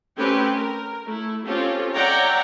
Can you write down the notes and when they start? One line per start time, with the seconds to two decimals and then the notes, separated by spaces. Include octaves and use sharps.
0.19 A3 C4 C#4 G4 B4 G5
0.55 A#4
1.05 A3 E4
1.46 C4 C#4 F4 G4 A4
1.94 C#5 D5 E5 F#5 G5 A#5